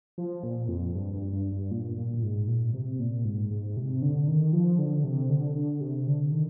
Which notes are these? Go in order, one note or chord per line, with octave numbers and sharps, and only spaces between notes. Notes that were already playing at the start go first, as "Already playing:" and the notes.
F3
A#2
F2
G2
G2
G2
G2
A#2
A#2
A#2
G#2
A#2
C3
A#2
G#2
G#2
C3
D3
D#3
F3
D3
C3
D3
D3
C3
D3
D#3